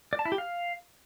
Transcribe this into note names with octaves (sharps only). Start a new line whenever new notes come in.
D5
A5
E4
G4
F5